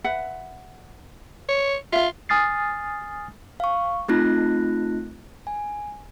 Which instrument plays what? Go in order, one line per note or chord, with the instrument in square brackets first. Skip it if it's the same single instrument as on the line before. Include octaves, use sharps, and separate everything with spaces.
[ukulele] B4 E5 F#5
[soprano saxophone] C#5
[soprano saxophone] F4 [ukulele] E5 F5
[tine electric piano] G#5 D#6 F6 A6 C7
[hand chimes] F5 C#6
A3 C4 D#4 F4 F#6 A#6
G#5